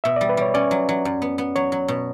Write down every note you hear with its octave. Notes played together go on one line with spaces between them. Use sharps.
B2 E5
G3 D5
B4
G3 C#5
C#4 D5
F#3
F#3
F#2
B3
B3
F#3 C#5
F#3
B2